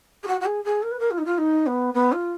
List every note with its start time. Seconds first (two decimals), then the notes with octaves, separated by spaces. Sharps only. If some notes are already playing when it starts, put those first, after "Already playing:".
0.23 G#4
0.27 F#4
0.40 F#4
0.45 G#4
0.64 G#4
0.82 A#4
0.91 B4
0.99 A#4
1.10 F4
1.18 D#4
1.25 F4
1.38 D#4
1.66 B3
1.94 B3
2.12 F4